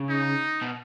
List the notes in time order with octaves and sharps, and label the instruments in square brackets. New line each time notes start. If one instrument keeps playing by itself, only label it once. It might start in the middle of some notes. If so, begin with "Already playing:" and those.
Already playing: [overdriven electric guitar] C#3
[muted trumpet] D#4
[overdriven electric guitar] B2